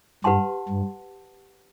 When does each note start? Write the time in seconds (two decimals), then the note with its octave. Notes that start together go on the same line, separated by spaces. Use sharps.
0.24 G2 G4 B4 F#5 A5 C6
0.69 G2